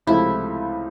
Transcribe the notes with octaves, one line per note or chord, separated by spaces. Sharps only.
C#2 C3 F3 A3 E4